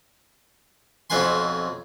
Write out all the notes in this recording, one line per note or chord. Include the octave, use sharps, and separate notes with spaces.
B1 F2 C4 B4 G#5 C6